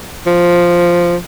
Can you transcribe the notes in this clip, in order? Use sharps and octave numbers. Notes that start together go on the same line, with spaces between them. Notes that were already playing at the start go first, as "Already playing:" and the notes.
F3